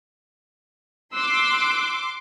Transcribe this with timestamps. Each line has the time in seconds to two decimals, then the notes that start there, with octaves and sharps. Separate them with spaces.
1.14 C6 D6 E6 F#6